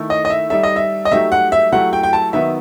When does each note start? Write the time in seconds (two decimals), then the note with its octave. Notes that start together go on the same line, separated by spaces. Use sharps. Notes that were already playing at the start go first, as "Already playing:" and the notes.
Already playing: D#3 A3 E4 A4
0.10 D#5
0.25 D#5
0.30 E5
0.50 G3 D#4 A4 E5
0.63 D#5
0.76 E5
1.05 D#5
1.11 F#3 A3 D#4 G4 E5
1.32 F#5
1.52 E5
1.72 F#3 A3 E4 G4 F#5
1.93 G5
2.03 G5
2.13 A5
2.33 D#3 F#3 B3 E5